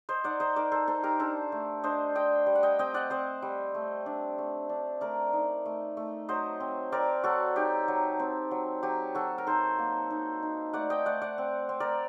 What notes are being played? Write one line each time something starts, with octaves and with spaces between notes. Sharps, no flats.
C5 D#5
D#4 D5 F#5
C5 D#5
D#4 A#4 D5
A4 C5
D#4 A4 C5
G4 A#4
D4 A4 C5
A3
D4 C5 D#5
D4 D#5 G5
G3
F#5
D#5 G5
C4 D#5 G5
D5 F#5
C4 C5 D#5
G3
A3
D4
A3
D4
A3 A#4 D5
D#4
A3
A3
F#3 C5 D#5
C4
C4 A#4 D5
F#3 F#4 A4
D#4 G4
F#3
C4
F#3
F#3 G4
F#3 F#4 A4
A#4
D#4 A4 C5
A#3
D#4
D#4
A3 D5 F#5
D#5 G5
A3 D5 F#5
D5 F#5
C4
C4
A#4 D5